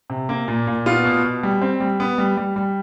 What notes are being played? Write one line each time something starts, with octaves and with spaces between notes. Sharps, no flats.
C3
A#3
A#2
A#2
B3 F4
B2
B2
G3
C4
G3
B3
G3
G3
G3